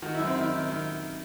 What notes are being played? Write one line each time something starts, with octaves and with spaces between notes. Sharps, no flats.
D#3 F#4
E4
F#2
C4
D#3 E4
D#3
D#3